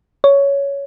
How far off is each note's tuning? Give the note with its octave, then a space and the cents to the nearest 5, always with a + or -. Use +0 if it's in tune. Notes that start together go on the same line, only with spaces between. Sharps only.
C#5 +10